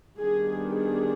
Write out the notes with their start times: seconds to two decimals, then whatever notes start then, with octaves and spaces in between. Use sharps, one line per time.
0.18 D#3 G3 B3 D4 G#4
0.71 G#4